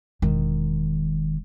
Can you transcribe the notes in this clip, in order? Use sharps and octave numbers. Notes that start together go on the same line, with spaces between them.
E1 D#3